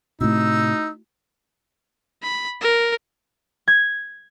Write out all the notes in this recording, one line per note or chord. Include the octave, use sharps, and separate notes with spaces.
A2 C3 A3 D#4 E4 F#4 E6
B5
A#4
G#6